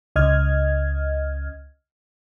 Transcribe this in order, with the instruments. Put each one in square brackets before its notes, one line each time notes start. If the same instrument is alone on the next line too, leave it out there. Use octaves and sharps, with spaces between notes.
[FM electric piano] C#2 D#5 F6 G#6